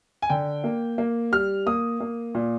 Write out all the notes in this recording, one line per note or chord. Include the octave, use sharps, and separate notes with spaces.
G#5
D3 G5
A#3
A#3
G3 F6
A#3 D#6
A#3
A#2